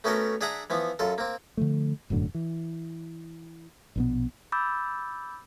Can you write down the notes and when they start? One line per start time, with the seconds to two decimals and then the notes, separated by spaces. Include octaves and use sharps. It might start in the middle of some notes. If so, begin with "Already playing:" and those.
0.04 A3 B3 C#4 F#4 A4 A#4
0.41 D4 G#4 E5 F#5 A#5
0.70 E3 F3 B3
0.99 F#2 F4 A4
1.18 A#3 C4
1.57 D3 F3 A3
2.10 E1 F#2 A2 D3
2.35 E3
3.96 A#1 B2 B3
4.52 B5 D6 E6 G6 A6